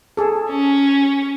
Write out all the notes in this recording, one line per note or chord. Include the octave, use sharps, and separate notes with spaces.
G#4 A4
C#4